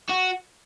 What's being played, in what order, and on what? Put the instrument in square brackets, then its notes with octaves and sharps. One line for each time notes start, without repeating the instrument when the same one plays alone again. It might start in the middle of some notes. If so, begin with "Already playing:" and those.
[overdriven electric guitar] F#4